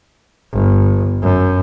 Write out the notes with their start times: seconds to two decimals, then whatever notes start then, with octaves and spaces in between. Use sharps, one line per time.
0.53 G1
1.22 F#2